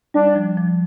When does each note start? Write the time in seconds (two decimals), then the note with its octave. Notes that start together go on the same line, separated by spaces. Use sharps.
0.14 G3 D4
0.35 F3
0.57 F3